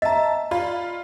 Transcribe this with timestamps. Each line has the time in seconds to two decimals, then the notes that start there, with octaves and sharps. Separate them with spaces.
0.02 D#5 E5 A5 A#5
0.51 F4 D5 B5